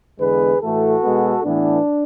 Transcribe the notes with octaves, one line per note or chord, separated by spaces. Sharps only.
E2 D3 G#3 B3 G#4 B4
A2 E3 A3 F#4 A4
B2 G#3 B3
A2 E3 B3 D4